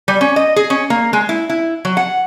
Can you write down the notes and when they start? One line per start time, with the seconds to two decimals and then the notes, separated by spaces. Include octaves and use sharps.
0.08 G3
0.21 C#4
0.36 D#5
0.56 G#4
0.70 C#4
0.90 A#3
1.13 G#3
1.29 E4
1.50 E4
1.85 F#3
1.97 F#5